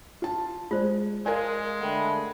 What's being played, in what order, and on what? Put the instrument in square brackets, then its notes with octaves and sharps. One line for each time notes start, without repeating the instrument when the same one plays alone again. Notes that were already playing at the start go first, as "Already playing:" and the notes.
[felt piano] F4 A5
[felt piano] G#3 [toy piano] F4 C5 D5
[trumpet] G#3 [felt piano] A#4 F5 G#5 [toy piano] D5
[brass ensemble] D3 A3 B4 [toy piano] F#5 G5